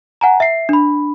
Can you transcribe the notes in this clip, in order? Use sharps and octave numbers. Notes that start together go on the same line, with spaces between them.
F#5 G#5 A#5
E5 C7
D4 B5